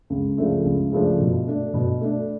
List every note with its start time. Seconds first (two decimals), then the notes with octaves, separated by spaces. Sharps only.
0.10 C#2
0.37 C#3 F3 A3 D4
0.65 C#2
0.92 C#3 F3 A3 D4
1.20 B2
1.47 A3 D4
1.74 B2
2.01 A3 D4